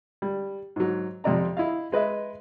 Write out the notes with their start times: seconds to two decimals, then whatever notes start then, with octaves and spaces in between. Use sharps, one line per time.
0.22 G3
0.76 G#2 F#3
1.24 F2 C3 D5 A#5
1.57 E4 D#5 F5
1.92 G#3 B4 D#5 E5